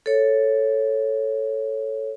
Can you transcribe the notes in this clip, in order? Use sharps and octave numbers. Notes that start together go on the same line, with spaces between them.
A4 C#5